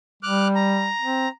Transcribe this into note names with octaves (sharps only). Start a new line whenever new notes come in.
G3 D6 F6 F#6
A#5
C4